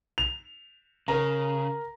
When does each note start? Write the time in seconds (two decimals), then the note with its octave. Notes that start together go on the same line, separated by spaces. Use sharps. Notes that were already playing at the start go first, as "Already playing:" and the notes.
0.18 F7
1.08 C#3 A#4 A#5